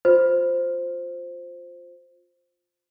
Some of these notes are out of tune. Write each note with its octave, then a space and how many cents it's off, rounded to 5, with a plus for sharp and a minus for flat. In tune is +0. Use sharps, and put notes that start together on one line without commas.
F4 +15 C5 +0